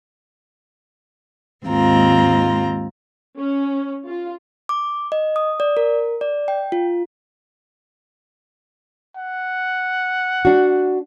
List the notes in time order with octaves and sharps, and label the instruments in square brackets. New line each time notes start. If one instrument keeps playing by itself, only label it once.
[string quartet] D#2 G#2 G#3 C4 F4 A#5
[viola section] C#4
F4
[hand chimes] D6
D#5
D#6
D5
A#4
D5
G5
F4
[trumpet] F#5
[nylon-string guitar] D4 F#4